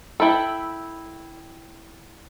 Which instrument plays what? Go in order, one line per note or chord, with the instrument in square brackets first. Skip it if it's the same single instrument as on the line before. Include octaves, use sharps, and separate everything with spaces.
[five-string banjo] E4 A4 [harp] G5 B5 E6